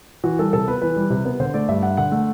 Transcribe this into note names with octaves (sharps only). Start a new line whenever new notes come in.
E3 F#4
G3 A4
C3 A4
B3 B4
E3 B4
G3
C3
B3
D3 C5
A3 D5
G2 E5
D4 F#5
D3 F#5
A3